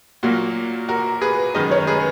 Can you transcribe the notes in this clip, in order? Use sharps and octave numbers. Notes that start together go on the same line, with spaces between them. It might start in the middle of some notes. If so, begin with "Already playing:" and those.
A#2 F#3 A#3 F#4
F#4 A#4
G#4 B4
F#2 D#3 G#3 B4 D#5
A#4 C#5
G#4 B4